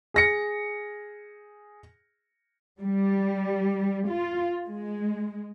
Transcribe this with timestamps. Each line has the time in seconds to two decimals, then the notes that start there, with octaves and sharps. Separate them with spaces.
0.14 G#4 A#6 C#7
2.80 G3
4.07 F4
4.67 G#3